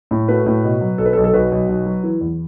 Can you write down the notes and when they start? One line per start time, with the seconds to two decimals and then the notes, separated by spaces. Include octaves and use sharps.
0.11 A2
0.28 A3 F#4 B4
0.46 A2
0.64 B2
0.81 F#3
0.98 B1 A4
1.05 B4
1.13 A4
1.17 B1
1.24 A4
1.33 B1 F#4 B4
1.51 B1
1.69 B1
1.86 F#3
2.03 E3
2.21 E2